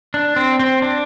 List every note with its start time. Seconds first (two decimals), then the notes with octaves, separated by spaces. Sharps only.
0.14 D4
0.36 C4
0.59 C4
0.82 D4